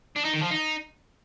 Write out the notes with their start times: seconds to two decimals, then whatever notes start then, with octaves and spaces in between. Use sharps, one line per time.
0.16 D4
0.25 D#4
0.34 D#3
0.43 F3
0.51 D#4